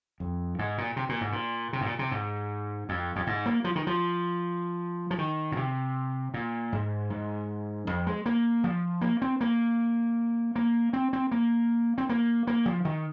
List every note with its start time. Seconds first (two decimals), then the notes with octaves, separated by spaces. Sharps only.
0.20 F2
0.59 G#2
0.78 A#2
0.96 C3
1.09 A#2
1.21 G#2
1.32 A#2
1.73 C3
1.81 G#2
1.86 A#2
1.99 C3
2.11 G#2
2.89 F2
3.16 F2
3.27 G#2
3.46 A#3
3.64 F3
3.76 D#3
3.87 F3
5.11 F3
5.18 D#3
5.52 A#2
5.57 C3
6.34 A#2
6.72 G#2
7.10 G#2
7.87 F2
8.07 G#3
8.26 A#3
8.64 F3
9.01 A#3
9.22 C4
9.41 A#3
10.56 A#3
10.93 C4
11.13 C4
11.31 A#3
11.98 C4
12.09 A#3
12.47 A#3
12.66 F3
12.85 D#3